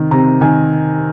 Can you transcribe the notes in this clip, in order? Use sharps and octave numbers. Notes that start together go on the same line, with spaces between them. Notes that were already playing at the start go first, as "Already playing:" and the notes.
Already playing: C3 D#3
C3 A#5
D#3 G#5